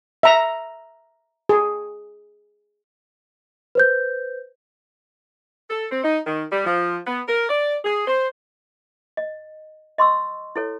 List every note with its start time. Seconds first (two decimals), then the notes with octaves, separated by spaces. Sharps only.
0.23 E5 A#5
1.49 G#4
3.75 B4 C5 G6
5.70 A4
5.91 C4
6.04 D#4
6.26 D#3
6.52 G3
6.65 F3
7.07 B3
7.28 A#4
7.49 D5
7.85 G#4
8.08 C5
9.17 D#5
9.98 D#5 C6 C#6 E6
10.56 E4 A4 C#5